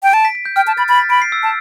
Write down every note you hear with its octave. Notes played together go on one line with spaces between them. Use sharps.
G5
A5 D7
B6
B6
G6
G5 F6
A5
B5 A6
B5 A6
B6
B5 D7
C7
E6
A5